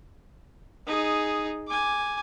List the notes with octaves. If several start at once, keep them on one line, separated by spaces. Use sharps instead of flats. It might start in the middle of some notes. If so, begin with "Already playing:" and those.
D#4 G#4
G#5 D6